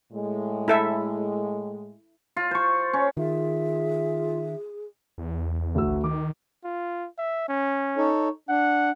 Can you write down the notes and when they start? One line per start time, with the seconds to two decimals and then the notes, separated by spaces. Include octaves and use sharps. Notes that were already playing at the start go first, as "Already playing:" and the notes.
0.13 A2 G#3
0.68 E4 A4 E5
2.36 F4
2.51 C5 C#6
2.93 C#4
3.17 D#3 F4 G#4 E5
5.18 E2
5.75 D2 F#4 E6
5.87 A1
6.04 D#3 D6
6.64 F4
7.18 E5
7.48 C#4
7.97 D#4 A4 C#5
8.49 D4 F#5